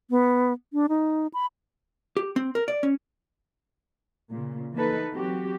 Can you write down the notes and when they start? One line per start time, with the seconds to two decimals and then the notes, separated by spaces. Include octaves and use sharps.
0.10 B3
0.73 D4
0.89 D#4
1.34 B5
2.17 G4
2.36 C4
2.55 A#4
2.68 D5
2.83 C#4
4.31 A#2 C#3
4.74 E3 A#3 B3 D#4 A4 B4
5.11 F#3 C4 F#4 G4